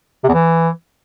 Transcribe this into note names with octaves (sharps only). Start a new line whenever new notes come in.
C3
E2
E3